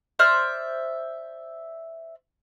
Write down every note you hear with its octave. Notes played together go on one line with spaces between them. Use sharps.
C5 D5 E5 F6